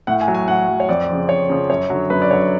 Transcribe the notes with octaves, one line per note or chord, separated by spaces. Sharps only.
A2 F#5
G#5
F#3
G#5
A2 F#5
F#3
C#5
F2 D5
C#3 F3
F2 C#5
C#3 F3
F#2 C#5
D3 F#3
F#2 B4
D5
D3 F#3 C#5